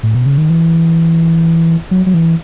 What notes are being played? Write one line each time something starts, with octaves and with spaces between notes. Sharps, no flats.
A2
B2
C#3
D#3
E3
F#3
F#3
E3